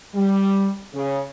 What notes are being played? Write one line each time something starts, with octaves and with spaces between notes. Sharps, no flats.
G3
C#3